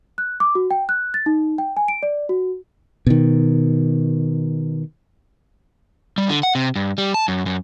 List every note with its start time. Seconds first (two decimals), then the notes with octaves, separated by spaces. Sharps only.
0.18 F#6
0.40 D6
0.55 F#4
0.71 G5
0.89 F#6
1.14 A6
1.26 D#4
1.58 G5
1.77 G#5
1.88 D7
2.03 D5
2.29 F#4
3.07 B2 D#3
6.18 G3
6.29 D3
6.43 F#5
6.55 C3
6.76 G2
6.98 G3
7.14 A5
7.28 F#2
7.46 F#2